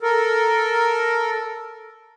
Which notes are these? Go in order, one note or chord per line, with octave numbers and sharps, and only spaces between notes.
A4 A#4